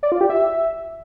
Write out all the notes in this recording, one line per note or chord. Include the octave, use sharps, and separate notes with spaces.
D5
F4
G4
E5